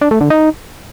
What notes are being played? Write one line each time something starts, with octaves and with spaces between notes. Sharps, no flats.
D4
A3
D3
D#4